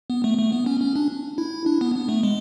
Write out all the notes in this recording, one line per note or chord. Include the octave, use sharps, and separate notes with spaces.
B3
A3
A3
B3
C#4
C#4
D4
E4
D4
B3
B3
A3
G#3